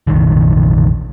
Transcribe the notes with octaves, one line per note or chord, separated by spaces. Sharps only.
F1 A#1 D#3